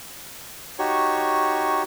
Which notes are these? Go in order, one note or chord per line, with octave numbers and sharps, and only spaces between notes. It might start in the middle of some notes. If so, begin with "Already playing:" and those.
D#4 F#4 G4 C#5 C#6